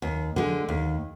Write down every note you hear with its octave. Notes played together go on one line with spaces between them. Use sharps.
D#2
D3 G#3
D#2